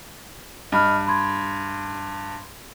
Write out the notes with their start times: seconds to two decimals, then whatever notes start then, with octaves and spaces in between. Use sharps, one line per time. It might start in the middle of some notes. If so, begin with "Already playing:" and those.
0.72 G2 D#5 B5 F6
1.07 B5 C6 G#6